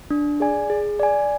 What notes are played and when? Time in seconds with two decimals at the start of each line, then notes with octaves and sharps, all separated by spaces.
0.10 D4
0.40 G#4 D5 G#5
0.70 G#4
1.00 D5 G#5